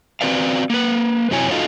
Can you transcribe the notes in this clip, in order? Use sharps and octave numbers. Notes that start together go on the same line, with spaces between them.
C4 F#4 B4 D5 F5
A#3 B4
F#2 C3 F#3 E4 C#5 G#5
D#4 F4 F#4 A4 D#5 F5